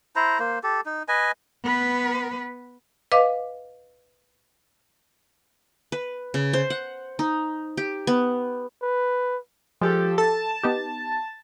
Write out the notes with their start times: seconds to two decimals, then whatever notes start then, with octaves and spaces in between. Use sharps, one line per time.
0.16 E4 C5 A#5
0.39 A#3 C5
0.63 G4 A4
0.86 D#4
1.08 B4 D#5 G#5
1.64 B3 B4
3.12 B4 D#5 F5 D6
5.92 B4
6.34 C#3
6.53 C5
6.70 F#5
7.19 D#4
7.77 G4
8.07 B3
8.82 B4
9.81 F3 G#3 G4 A4
10.18 A4 A5
10.63 B3 D#4 G4